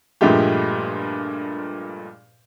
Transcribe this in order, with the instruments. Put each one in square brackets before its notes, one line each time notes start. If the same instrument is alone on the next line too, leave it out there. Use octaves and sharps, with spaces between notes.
[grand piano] G2 A#2 F3 G#3 A3 G4